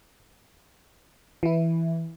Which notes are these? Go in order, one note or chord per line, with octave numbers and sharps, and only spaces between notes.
E3 E4